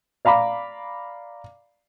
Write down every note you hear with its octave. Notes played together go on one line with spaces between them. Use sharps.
D5 F5 A#5 B5 D6